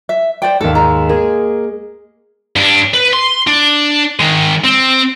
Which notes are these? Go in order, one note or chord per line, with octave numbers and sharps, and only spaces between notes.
E5
C5 D5 G5
D#2 G#2 A4
G#3 A#5
A#3 G#4
G2 D4
B4
C6
D4
D#3 G#3
C4